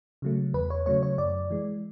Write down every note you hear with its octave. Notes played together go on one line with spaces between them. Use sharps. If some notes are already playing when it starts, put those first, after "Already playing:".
C#3 F#3 A3
E2 B4
C#5
C#3 F#3 A3 C#5
C#5
F#2 D5
E3 G#3